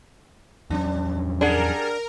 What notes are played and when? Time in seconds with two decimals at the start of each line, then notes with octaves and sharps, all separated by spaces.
0.70 E2 F#3 C#4 D4
1.41 G3 D4 G#4 A#4 F#5